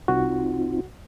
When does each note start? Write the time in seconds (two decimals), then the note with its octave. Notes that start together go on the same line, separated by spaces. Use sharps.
0.08 C2 C4 D#4 F4 F#4